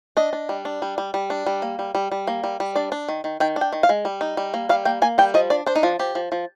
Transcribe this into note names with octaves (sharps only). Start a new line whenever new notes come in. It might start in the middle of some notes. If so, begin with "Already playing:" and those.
D4 D#5
D4
G3
D4
G3
G3
G3
D4
G3
A#3
G3
G3
G3
A#3
G3
G3
D4 D5
D4
D#3
D#3
D#3 G5
D4
G5
D#3
F5
G#3
G3
D#4
G3
A#3
G3 F5
A#3 G5
A#3 G#5
G3 G5
F3 D#5
D4 D5
D4 C5
D#4
F3 F4
F3 G4
F3
F3